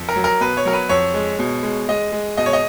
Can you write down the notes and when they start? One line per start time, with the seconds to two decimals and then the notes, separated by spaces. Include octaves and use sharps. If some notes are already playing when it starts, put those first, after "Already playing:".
Already playing: F2
0.09 A#4
0.16 F#3
0.24 A#4
0.40 B2 B4
0.57 C#5
0.65 F#3 A#4
0.73 B4
0.89 F2 C#5
1.14 G#3
1.39 B2
1.63 G#3
1.89 G#3 D#5
2.12 G#3
2.37 B2 D#5
2.46 C#5
2.53 D#5